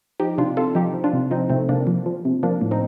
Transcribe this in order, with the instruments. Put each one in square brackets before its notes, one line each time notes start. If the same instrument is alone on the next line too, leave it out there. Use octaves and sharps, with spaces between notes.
[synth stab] F3 D#4 G4
C3 D4 F4
C3 F4 A4
F3 D#4 G4
F3
D4 F4
C3
F3 C4 D#4
C3 A3 C4
C3 A#3 D4
F3
F3
C3
F3 A#3 D4
A2
C4 D#4